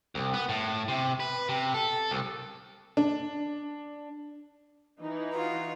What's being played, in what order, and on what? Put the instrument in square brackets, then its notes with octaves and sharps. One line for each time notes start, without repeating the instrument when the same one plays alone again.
[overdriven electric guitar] C2
B3
A2
C3
B4
C3
A4
C2
[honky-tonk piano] D4
[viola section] E3 D#4
[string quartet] F4 F#4